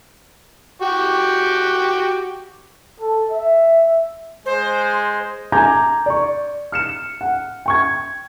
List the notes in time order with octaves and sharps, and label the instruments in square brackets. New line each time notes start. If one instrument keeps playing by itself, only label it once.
[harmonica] F#4 G4 G5
[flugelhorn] A4
E5
[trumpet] G#3 [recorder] C5
[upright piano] G#5 A#5 D6 G6 G#6
D5 C#6
F6 C#7 E7
F#5
G5 C#6 G#6